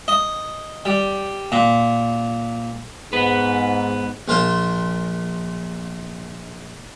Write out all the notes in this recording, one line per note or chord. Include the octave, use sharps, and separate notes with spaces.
D#5
G3
A#2
G#2 B3 B4
A#1 F4 A#4 C5